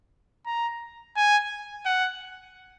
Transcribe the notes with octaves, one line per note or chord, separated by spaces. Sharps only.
A#5
G#5
F#5